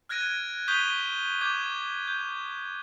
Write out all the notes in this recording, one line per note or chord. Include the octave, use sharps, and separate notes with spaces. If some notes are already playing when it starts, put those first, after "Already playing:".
F6 F#6 G#6 A#6 D7 D#7
C#6 D#6 G6 B6 D#7 G7
D6 G6 G#6
G6